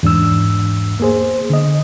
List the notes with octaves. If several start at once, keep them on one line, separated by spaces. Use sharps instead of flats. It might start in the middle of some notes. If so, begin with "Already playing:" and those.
E2 G#2 D4 E6
A#3 B3 G#4 C5
D3 D#5